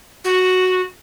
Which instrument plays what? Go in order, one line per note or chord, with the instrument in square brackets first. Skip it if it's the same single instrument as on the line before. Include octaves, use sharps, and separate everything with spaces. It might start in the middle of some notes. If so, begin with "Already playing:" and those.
[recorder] F#4